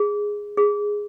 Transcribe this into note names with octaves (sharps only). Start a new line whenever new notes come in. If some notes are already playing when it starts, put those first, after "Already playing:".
Already playing: G#4
G#4